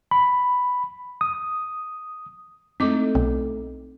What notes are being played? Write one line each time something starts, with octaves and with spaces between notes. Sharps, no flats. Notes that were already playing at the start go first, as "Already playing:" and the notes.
B5
D#6
A3 C4 D#4 D6
B1